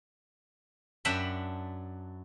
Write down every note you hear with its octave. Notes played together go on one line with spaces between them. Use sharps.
F#2 D4 E5 F#5 G5 B5